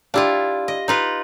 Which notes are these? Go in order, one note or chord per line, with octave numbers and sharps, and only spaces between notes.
D4 E4 F4 G4 F5
D#5
D#4 F4 B4